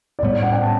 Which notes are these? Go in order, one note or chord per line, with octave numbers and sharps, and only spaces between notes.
D5
A2 G3 B3 C#5
D5
F#5
G5
A5